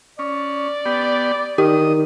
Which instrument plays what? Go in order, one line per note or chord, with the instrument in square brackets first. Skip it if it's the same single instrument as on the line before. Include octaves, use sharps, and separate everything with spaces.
[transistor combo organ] C#4 [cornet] D5
[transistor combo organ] B3 G4
[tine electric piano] D#3 [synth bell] G4 [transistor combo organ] D#5